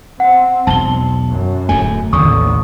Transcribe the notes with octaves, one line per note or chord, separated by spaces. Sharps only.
C4 F#5
E1 B1 A5 G7
F#2
D1 E2 A3 G#5
A1 D#2 D3 D#3 C#6 D#6